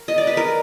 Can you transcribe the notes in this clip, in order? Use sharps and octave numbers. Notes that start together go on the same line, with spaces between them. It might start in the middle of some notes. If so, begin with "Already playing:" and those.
Already playing: A#4
D#5
D5
B4
A#4